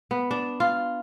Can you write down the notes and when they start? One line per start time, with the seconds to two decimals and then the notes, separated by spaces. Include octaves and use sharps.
0.11 B3
0.31 D4
0.60 F4